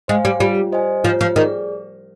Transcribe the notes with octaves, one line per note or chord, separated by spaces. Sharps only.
G#3 C5 F5 G#5
G3
G3 F4
C5 D#5 G#5
F3 F4
F3
D#3 G#4 D5